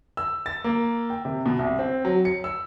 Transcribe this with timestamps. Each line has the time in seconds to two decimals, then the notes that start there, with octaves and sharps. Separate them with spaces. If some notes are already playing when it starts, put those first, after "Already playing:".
0.17 E6
0.46 A6
0.64 A#3
1.10 G5
1.25 C3
1.46 B2
1.59 C2
1.79 C4
2.05 F#3
2.25 C#7
2.44 E6